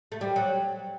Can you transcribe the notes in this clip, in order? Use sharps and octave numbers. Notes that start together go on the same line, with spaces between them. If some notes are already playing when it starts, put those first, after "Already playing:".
A3
G3
F#3